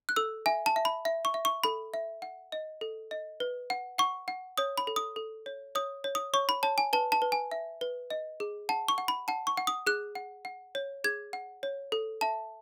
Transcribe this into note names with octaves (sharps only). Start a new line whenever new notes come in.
F#6
A4 E6
E5 G#5
A5
E5
B5
E5
C#6
E5
C#6
A4 B5
E5
F#5
D#5
A4
D#5
B4
F#5
F#5 C#6
F#5
C#5 D#6
B5
A4
D#6
A4
C#5
C#5 D#6
C#5
D#6
C#5 C#6
B5
C#5 A5
G#5
B4 A5
A5
B4
G#5
E5
B4
D#5
G#4
F#5 A5
C#6
F#5
B5
F#5 A5
C#6
F#5
D#6
G#4 F#6
F#5
F#5
C#5
G#4 G#6
F#5
C#5
A4
E5 A5